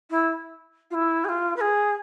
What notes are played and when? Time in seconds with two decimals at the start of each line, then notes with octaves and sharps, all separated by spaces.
0.11 E4
0.91 F4
0.94 E4
1.25 G#4
1.29 F4
1.56 B4
1.61 G#4